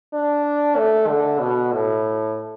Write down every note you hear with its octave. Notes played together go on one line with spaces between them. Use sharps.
D4
A3
D3
B2
A2